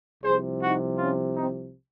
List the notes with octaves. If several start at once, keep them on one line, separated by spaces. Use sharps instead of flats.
C2 C3 F3 G#4 C5
D#4 F#4
C#4 F4
C4 D#4